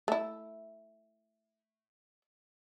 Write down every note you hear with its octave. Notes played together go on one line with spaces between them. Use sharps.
A3 E4